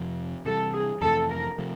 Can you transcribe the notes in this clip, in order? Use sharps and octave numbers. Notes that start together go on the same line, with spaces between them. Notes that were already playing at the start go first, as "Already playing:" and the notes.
Already playing: F2 C3 F3
C3 E3 G3 A4
G#4
F2 C3 E3 A3 A4
A#4
C3 F3 A3